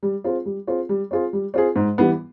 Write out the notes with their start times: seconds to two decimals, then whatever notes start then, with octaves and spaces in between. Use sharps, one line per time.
0.03 G3
0.24 C4 F4 G#4
0.46 G3
0.67 C4 F4 G#4
0.89 G3
1.11 C4 F4 G#4
1.33 G3
1.54 C4 F4 G#4
1.76 G#2
1.98 E3 G3 B3